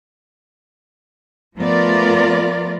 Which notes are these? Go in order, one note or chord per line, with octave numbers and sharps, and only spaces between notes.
F3 A3 B3 F4 A#4 D5